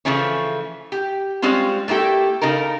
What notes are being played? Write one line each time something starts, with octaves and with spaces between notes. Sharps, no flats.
C#3 E3 F3 A3 C#4
G4
G3 G#3 C4 C#4 F4
A3 A#3 E4 G4 A4
C#3 D#4 A4 A#4